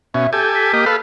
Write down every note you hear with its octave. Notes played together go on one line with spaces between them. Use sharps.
B2 C#4 E5
G4 A4 G#5 G6
B6
A#3 G4 D#5
A4 B4 F5